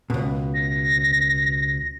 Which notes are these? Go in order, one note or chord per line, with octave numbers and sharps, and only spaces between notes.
C#2 B2
A#6